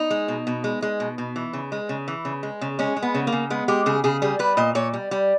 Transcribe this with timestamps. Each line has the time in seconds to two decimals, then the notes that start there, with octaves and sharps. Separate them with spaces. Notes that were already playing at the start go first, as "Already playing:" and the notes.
Already playing: D#4
0.10 G#3
0.28 B2
0.47 B2
0.64 G#3
0.82 G#3
1.00 B2
1.18 B2
1.36 E3
1.53 C#3
1.72 G#3
1.89 C#3
2.08 E3
2.25 C#3
2.43 G#3
2.61 C#3
2.79 G#3 C#4
2.96 G#3
3.02 B3
3.14 C#3
3.27 A#3
3.32 C#3
3.50 G#3 B3
3.68 G#3 G4
3.86 C#3 G#4
4.04 C#3 G#4
4.22 G3 G#4
4.39 G3 B4
4.57 A#2 D#5
4.75 A#2 C#5
4.93 G3
5.11 G3